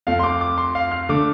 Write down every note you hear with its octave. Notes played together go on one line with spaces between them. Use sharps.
F2 F3 A3 F5
C6
D6
D6
C6
F5
F6
D3 A3 D6